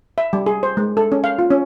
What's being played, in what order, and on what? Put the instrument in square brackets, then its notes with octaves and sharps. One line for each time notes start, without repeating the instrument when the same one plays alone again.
[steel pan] E5
G3
G#4
C5
G#3
A4
C#4
F5
F4
C#4